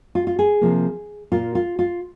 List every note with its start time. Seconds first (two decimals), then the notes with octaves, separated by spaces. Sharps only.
0.15 F4
0.27 F4
0.39 G#4
0.61 C3 F3 A#3
1.32 A#2 A#3 F4
1.55 F4
1.79 F4